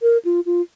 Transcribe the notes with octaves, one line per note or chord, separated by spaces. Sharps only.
A#4
F4
F4